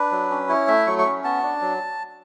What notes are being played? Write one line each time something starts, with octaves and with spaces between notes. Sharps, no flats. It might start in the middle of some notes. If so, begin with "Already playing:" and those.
Already playing: D4 B4
F#3
C#4
E4 C#5
A3 E5
F#3 C#6
C#6
C#4
B3 A5
D4
F#3